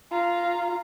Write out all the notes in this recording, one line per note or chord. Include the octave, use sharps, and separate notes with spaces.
F4 A#5